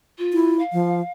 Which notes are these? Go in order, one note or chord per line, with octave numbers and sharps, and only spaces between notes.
F4
E4
F5
F3